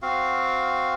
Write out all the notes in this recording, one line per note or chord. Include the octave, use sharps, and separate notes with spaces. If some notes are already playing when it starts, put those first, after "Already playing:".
C4 F#4 F5